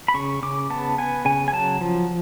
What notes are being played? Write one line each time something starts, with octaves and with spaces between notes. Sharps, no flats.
B5
C#3 C#6
C#3 D6
B3 A5
B3 G#5
C#3 G#5
G#5
F#3 A5
F3